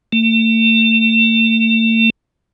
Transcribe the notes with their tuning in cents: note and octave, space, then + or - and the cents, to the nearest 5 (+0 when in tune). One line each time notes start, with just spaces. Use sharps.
A3 +40